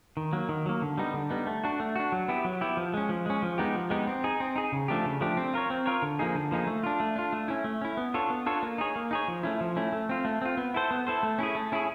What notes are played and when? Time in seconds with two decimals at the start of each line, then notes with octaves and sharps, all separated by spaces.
0.17 D#3
0.33 F#3 A#3
0.49 D#3
0.66 F#3 A#3
0.82 D3
0.98 G3 B3 D#4
1.14 D3
1.30 G3 B3 D#4
1.47 A3
1.64 D4 F#4
1.80 A3
1.96 D4 F#4
2.12 F#3
2.28 B3 E4 G4
2.45 F#3
2.61 B3 E4 G4
2.77 F3
2.94 G#3 C#4
3.09 F3
3.26 G#3 C#4
3.42 F3
3.58 G#3 B3 D#4 G4
3.75 F3
3.90 G#3 B3 D#4 G4
4.07 C4
4.24 D#4 G#4
4.40 C4
4.56 D#4 G#4
4.72 C#3
4.88 F3 A3 D4 G4
5.05 C#3
5.21 F3 A3 D4 G4
5.37 C4
5.54 F4 A#4 C#5
5.70 C4
5.86 F4 A#4 C#5
6.02 D3
6.19 F3 A#3 D#4 G#4
6.35 D3
6.51 F3 A#3 D#4 G#4
6.67 A3
6.83 D4 F4
7.00 A3
7.16 D4 F4
7.33 A3
7.48 C#4 E4
7.64 A3
7.82 C#4 E4
7.97 B3
8.14 D4 F4 A4 C#5
8.30 B3
8.46 D4 F4 A4 C#5
8.63 A#3
8.78 D#4 G#4 C#5
8.96 A#3
9.11 D#4 G#4 C#5
9.28 F3
9.43 A3 C#4 E4
9.61 F3
9.77 A3 C#4 E4
9.92 A3
10.09 C4 F4
10.25 A3
10.41 C4 F4
10.57 B3
10.74 E4 A4 C5
10.91 B3
11.07 E4 A4 C5
11.23 A3
11.39 C#4 E4 G#4
11.55 A3
11.72 C#4 E4 G#4